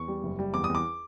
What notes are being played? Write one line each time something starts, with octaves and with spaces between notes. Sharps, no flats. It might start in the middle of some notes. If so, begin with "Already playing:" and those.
Already playing: E2 C#6
G3
F#1
G3
E2 D6
D#6
E2
D6